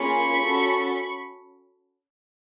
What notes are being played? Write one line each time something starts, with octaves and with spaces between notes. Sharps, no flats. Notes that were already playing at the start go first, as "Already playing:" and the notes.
Already playing: A#3 C#4 F4 G#4 B5 C#6
C#4 F#4 A4